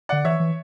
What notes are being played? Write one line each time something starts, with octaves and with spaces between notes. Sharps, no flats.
D3 D5 F#5
E3 C#5 E5
E3